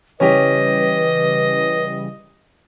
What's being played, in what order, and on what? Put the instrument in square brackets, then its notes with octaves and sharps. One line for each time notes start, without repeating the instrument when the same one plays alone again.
[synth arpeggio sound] C#3 E3 G3 [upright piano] C#4 G4 [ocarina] B4 [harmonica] D#5